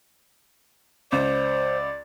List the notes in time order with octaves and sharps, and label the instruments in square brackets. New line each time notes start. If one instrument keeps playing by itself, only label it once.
[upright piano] C#2 [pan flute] C5 [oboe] D5